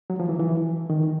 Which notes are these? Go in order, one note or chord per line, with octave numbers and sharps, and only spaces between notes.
F#3
F3
E3
E3
D#3